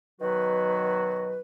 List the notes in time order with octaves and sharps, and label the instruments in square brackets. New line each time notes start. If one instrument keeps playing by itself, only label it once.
[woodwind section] B2 D#3 F#3 F#4 B4